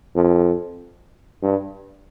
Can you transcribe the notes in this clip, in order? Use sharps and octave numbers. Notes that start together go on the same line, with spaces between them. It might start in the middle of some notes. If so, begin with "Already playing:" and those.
F2
G2